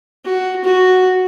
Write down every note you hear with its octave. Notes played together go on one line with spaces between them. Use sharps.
F#4
F#4